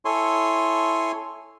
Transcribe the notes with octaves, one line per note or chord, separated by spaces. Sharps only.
E4 A4 C#5 G#5 C6